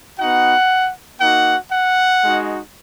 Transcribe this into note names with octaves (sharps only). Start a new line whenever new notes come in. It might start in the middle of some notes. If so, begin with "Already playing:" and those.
B3 D#4 F#4 F#5
A#3 D#4 F#4 F#5
F#5
G#3 D#4 F#4